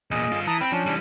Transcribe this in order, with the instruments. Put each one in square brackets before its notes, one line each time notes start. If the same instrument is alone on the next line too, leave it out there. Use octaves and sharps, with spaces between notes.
[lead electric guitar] E2 A#2 [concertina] G#4 D#5
[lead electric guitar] G2 F4
[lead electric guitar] E3 [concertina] A5 A#5 D#6
[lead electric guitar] C4 [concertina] G5 B5
[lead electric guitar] F3 [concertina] C#4 D4
[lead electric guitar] E3 G3